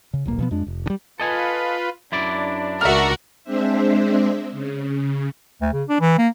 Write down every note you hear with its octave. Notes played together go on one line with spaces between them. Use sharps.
C#3
D#1 B1 A#3
B2 F3 B3
F2 G#3 D4
F1
D3 G3
F4 A4 B4 D#5 G#5
F#2 D4 E4 D5
C#2 F#4 A#4 E5 F6
G#3 C4 D4 C5 E5
C#3
D2
C#3
D4
E3
A#3